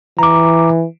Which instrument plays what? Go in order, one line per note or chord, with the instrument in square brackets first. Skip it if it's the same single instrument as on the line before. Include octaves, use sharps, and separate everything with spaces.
[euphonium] E3 [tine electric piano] A#5 D6